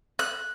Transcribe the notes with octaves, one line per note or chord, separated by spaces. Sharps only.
F#6